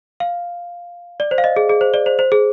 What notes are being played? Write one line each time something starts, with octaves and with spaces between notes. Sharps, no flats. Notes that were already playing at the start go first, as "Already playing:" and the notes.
F5
D5
C5
F5
D#5
G#4
G#4
C5
D5
C5
C5
G#4